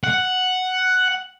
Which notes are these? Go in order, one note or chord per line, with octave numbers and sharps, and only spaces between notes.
F#5